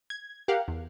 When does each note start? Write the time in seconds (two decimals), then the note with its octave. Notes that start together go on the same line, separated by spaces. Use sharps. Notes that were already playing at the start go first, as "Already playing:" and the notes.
0.10 G#6
0.48 G4 A#4 F5 F#5
0.68 E2